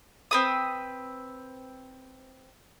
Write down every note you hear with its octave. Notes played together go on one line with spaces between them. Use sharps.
C4 B4 D#6